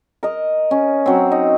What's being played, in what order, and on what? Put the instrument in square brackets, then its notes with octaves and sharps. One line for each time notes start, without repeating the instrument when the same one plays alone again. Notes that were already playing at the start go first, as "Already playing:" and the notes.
[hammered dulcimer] A#4 D#5
C#4
F#3 C4
D#4